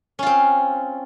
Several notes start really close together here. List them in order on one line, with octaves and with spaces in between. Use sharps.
C#4 F4 C4